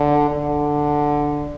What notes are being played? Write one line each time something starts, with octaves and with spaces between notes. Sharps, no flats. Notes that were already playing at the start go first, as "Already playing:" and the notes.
Already playing: D3
D3